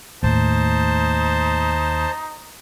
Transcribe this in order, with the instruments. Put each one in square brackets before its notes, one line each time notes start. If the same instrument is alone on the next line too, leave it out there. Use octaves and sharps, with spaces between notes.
[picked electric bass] D#2 [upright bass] A2 A3 [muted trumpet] D#4 [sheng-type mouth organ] C5 A5